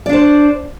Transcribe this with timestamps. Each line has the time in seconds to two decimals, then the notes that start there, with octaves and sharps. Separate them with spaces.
0.06 D5
0.09 D4
0.13 C5